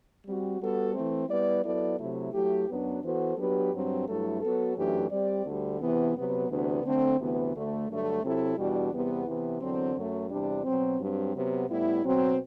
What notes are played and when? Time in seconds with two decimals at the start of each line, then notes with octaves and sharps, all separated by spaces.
0.25 G3 C4 F#4
0.60 G3 B3 F#4 A4
0.94 E3 A3 C4
1.29 G3 B3 E4 B4 D5
1.64 F#3 B3 E4 A4 D5
1.99 C3 F#3 A3 E4
2.33 F#3 A3 E4 G4
2.68 F#2 F#3 B3 D4
3.02 E3 B3 F#4 A4 C5
3.36 F#3 B3 D4 G4 B4
3.71 G2 F#3 C4
4.06 G2 F#3 A3 E4 A4
4.41 F#3 B3 F#4 A4
4.76 F#2 E3 A3 D4 G4
5.10 G3 C4 G4 D5
5.44 D2 D3 G3
5.80 E2 C3 E3 B3
6.14 C3 F#3 B3
6.48 D2 C3 E3 B3 D4
6.84 D3 A3 C4
7.18 D2 C3 E3 B3
7.52 D2 D3 A3
7.87 G2 D3 F#3 A3
8.22 C3 F#3 C4 E4 A4
8.57 E2 B2 G3 D4 F#4
8.91 E2 C3 G3 B3
9.26 C3 E3 B3
9.60 E2 D3 F#3 C4
9.95 F#2 F#3 A3
10.29 E2 C3 G3 D4
10.64 B2 F#3 C4
10.99 G2 F#3 C4
11.33 C3 F#3 B3
11.69 A2 G3 B3 E4
12.03 B2 F#3 C4